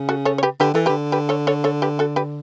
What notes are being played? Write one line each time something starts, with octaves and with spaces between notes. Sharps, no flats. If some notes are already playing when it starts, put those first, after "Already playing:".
Already playing: C#3
F#4 A4
A4 C#5
C#5
G4 B4
D3 G4 B4
E3 A4
D3 G4 B4
G4 B4
A4 C#5
A4 C#5
A4 C#5
G4 B4
F#4 A4
G4 B4